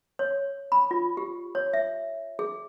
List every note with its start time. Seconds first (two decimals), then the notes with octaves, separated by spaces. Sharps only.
0.19 C#5
0.72 B5
0.91 F4
1.17 G4
1.55 C#5
1.73 E5
2.39 G#4